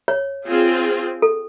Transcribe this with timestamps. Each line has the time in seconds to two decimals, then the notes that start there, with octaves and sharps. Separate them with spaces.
0.08 C#5
0.47 C4 F4 G#4
1.22 A4